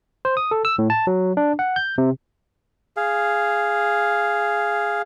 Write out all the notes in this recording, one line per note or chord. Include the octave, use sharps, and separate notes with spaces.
C5
D#6
A4
E6
A2
A5
F#3
D4
F#5
G6
C3
G#4 F5